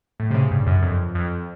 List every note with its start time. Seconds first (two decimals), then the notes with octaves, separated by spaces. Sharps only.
0.20 A2
0.31 C3
0.35 C#3
0.51 G2
0.67 F#2
0.82 F2
1.15 F2